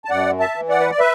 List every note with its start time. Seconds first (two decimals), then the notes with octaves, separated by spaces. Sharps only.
0.05 A5
0.10 F#2 D5 F#5
0.40 E5 A5
0.55 E3
0.69 D5 F#5
0.80 B4
0.90 D5
0.99 B4 E5